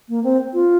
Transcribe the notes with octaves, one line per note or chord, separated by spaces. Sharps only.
A#3
C4
F4